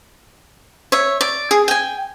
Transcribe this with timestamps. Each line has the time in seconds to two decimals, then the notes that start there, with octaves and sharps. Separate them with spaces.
0.92 C#5 E5
1.21 D5
1.51 G#4
1.68 G5 G#5